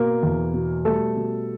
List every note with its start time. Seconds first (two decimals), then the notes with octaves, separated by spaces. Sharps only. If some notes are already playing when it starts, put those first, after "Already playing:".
Already playing: B2 A#3 A#4
0.23 E2
0.54 B2
0.85 G3 A3 A4
1.16 B2